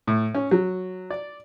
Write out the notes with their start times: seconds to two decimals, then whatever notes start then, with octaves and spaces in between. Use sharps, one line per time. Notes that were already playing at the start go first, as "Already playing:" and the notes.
0.08 A2
0.35 C#4
0.51 F#3
1.10 D5